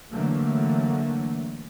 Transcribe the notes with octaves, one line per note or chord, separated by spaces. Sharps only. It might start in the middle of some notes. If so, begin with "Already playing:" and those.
D3 E3 F#3 A3 A#3